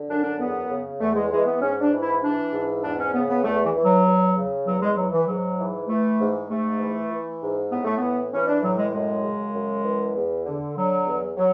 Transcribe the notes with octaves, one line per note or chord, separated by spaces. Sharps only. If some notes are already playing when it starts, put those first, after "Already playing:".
Already playing: D3
F#2 D4
D4
E2 B3
C#3
E2 A3
G#3
E3 G#3
B3
G#2 C#4
D4
E3
E4
E3 D4
G#2
E2 D4
C#4
C#3 B3
B3
E2 A3
E3
E3
F#3
E2
C#3
E2 F#3
G#3
E3 F#3
E3
G#2 F#3
E3
E3 A3
G#2
G#2 A3
E3
E3
G#2
A2 B3
A3
E3 B3
E3 C#4
D4
A2 F#3
G#3
F#2 G#3
C#3
F#2
E3
E2
D3
D3 F#3
E2
F#3